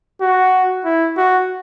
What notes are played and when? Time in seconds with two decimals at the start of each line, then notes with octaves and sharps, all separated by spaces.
0.21 F#4
0.85 E4
1.17 F#4